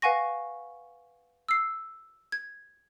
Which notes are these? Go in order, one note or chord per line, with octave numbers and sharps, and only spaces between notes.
B4 F5 F#5 G#5 C#6 A#6
E6 C7
G#6